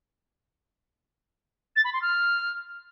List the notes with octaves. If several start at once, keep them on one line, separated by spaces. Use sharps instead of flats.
A6
B5
C6
F6